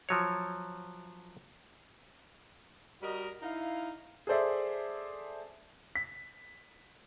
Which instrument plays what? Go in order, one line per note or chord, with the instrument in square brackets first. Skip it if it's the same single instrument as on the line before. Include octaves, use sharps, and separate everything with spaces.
[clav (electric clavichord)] F3 F#3 C#5
[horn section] G3 F#4 A#4 D#5
D#4 E4 F5
[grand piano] G#4 A4 C5 D5 E5
B6